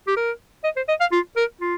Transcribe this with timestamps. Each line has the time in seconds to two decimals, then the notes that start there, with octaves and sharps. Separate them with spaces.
0.07 G4
0.17 A#4
0.64 D#5
0.76 C5
0.89 D#5
1.00 F5
1.12 F4
1.37 A#4
1.61 F4